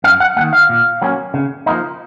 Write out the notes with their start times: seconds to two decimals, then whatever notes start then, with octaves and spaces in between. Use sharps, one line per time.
0.04 F#2 F5
0.20 F#5
0.37 D#3 F#3 A#3 F#5
0.53 F5
0.69 A#2
1.02 F#3 A#3 C#4
1.34 C#3
1.66 F3 A#3 D#4